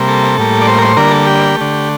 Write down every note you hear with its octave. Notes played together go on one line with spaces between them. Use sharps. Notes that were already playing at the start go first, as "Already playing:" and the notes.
Already playing: C3 G3 A#3
A4
A2 G3 A#3
D5
C5
A#4
C5
D3 G3 A#3 A#4
A4
G4
D3 A3